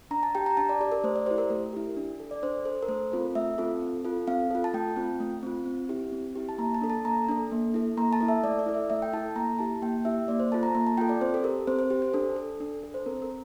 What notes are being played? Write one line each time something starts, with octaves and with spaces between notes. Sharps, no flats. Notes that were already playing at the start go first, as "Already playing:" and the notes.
D4 A#5
A5
G4 G5
A#5
D4 A5
D5
G4 D5
A#4
A3 C5
D5
E4 G4 C5
A#4
A3 A#4
E4 G4
D4
A4
D5
D4 C5
A4 C5
A#4
A3 C5
C4 F4 A4
A3 E5
C4 F4 A4
C4
F4 A4
C4 F5
F4 A4
A5
A3 G5
C4 F4
A3
C4 F4
C4
E4 G4
C4
E4 G4
A5
A#3 A#5
A5
D4 A4
A5
A#3 A#5
D4 A4
A#3
E4 A4
A#3 A#5
A5
E4 A4
E5
A3 D5
D5
E4 A4
E5
A3 E5
G5
E4 A4 A5
A#3 A#5
E4 G4 A5
A#3 G5
E4 G4 E5
A#3 D5
C5
F4 A4 A5
A#5
A#3 A#5
A5
F4 A4 G5
D5
C4 C5
A4
G4 A#4
C4 C5
C5
G4
C5
D4 A4
A4
D4
A4
C5
C4 A#4
A#4